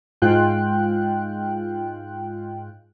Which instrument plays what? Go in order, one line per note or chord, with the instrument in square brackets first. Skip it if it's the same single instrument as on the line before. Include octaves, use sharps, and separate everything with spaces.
[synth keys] G#2 G#3 F4 G5 F#6